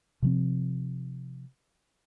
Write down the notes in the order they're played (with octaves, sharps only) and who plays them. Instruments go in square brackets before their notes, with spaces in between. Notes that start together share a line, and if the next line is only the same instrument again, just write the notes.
[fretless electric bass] C3 F3 C4